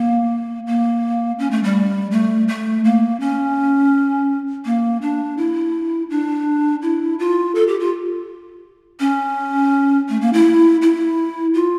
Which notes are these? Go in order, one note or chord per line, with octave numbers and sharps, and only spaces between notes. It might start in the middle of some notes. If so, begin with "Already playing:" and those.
Already playing: A#3
A#3
C#4
A3
G3
A3
A3
A#3
C#4
A#3
D4
E4
D4
E4
F4
A4
G4
F4
C#4
A3
A#3
E4
E4
F4